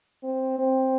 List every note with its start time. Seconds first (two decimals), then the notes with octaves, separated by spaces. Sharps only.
0.23 C4
0.59 C4